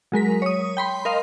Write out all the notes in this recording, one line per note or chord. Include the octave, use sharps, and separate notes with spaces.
F#3 G#3 A#4 B6
C#5 D#6
G5 B5 C6
A#4 D#5 F5 C6